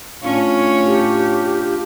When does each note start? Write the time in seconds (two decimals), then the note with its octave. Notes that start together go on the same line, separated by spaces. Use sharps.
0.23 A2 C#4 D4 F4 C#5 F5
0.86 G4